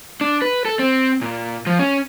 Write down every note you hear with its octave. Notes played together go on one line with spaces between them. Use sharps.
D4
B4
A4
C4
A#2
F3
C#4